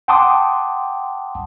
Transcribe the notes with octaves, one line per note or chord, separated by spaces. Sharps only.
F#5 G5 A5 C6 D6 D#6